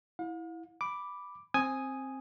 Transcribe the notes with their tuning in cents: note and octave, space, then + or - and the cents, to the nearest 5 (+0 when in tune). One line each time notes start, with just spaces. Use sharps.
E4 -5 F5 +45
B5 +0 D6 +0
C4 +10 G#5 +0 D#6 +0